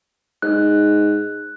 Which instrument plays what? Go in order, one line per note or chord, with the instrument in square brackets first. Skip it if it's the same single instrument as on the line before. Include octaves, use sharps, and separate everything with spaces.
[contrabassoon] G#2 [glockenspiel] F#6